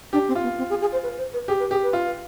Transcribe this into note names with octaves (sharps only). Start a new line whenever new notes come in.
D4 G4
C4
F4
B3
C4
G#4
G#4
C5
B4
C5
B4
G4 G#4
B4
G4 G#4
B4
F4